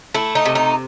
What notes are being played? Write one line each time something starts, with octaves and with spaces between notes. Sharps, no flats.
A3 E4
D#4
C3
D#4